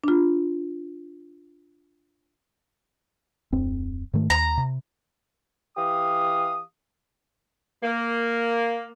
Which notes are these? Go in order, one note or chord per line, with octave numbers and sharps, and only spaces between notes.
D4 F4
D1 F2 C4
G#2 D#3 A3
D#2 A#5
C3
E3 G4 F5 D#6
A#3